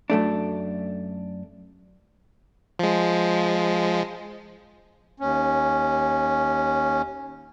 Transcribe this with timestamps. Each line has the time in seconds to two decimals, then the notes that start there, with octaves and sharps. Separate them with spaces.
0.10 F#2 A3 D4
2.79 F3 G#3
5.20 D#2 C#4